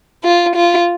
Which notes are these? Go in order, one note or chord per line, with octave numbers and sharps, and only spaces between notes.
F4
F4